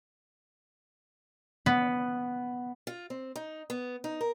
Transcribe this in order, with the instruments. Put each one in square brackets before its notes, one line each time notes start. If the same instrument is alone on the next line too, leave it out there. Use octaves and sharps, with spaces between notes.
[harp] B3
[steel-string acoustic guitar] F4
C4
D#4
B3
D#4
A#4